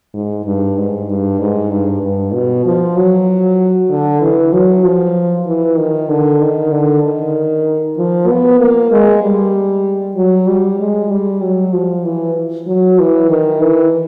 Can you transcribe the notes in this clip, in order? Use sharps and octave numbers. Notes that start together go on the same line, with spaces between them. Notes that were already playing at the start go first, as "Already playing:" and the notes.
G#2
G2
G#2
G2
G#2
G2
G2
B2
F3
F#3
D3
E3
F#3
F3
E3
D#3
D3
D#3
D3
D#3
F3
B3
A#3
G#3
G3
F#3
G3
G#3
G3
F#3
F3
E3
F#3
E3
D#3
E3